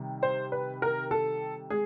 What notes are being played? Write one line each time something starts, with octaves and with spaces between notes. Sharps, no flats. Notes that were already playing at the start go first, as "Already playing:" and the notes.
Already playing: C3 D#3 G3
C5
B4
A#4
A4
G#3 G#4